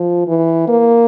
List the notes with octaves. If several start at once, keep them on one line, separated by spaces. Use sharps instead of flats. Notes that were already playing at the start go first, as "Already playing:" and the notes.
Already playing: F3
E3
A#3